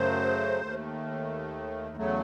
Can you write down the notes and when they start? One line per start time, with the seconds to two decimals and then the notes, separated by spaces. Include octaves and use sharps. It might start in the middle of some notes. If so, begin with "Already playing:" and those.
Already playing: F#2 C#3 F#3 A3 C5
0.61 D#2 D#3 A3
1.97 E2 C#3 F#3 A3